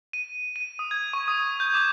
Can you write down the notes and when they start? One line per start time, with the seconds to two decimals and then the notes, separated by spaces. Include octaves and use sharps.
0.13 D#7
0.56 D#7
0.79 D#6
0.91 G#6
1.13 C#6
1.28 D#6
1.60 G6
1.74 D6